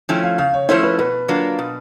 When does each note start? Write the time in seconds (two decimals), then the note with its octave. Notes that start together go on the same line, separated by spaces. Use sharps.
0.09 F3 A3 C#4 E4 G5
0.23 F5
0.38 C#3 F5
0.54 C#5
0.69 F3 A3 C#4 E4 C5
0.83 B4
0.98 B2 B4
1.28 F#3 A#3 D4 F4
1.59 B2